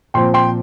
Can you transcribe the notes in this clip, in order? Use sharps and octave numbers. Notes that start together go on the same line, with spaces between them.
A#2 F3 C4 G5 C6
G5 C6